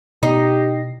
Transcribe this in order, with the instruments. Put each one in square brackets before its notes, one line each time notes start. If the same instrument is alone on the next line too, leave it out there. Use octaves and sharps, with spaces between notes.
[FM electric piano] B2 A#6 C7 [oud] D#4 [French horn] G4